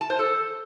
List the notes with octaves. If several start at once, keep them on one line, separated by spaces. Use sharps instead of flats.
A5
C5
A4